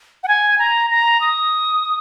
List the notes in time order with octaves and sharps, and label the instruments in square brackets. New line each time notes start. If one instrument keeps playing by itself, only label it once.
[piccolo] F#5
G#5
A#5
A#5
D#6